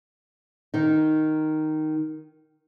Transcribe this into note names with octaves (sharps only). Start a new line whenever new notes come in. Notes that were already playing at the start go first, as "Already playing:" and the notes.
D#3 D#4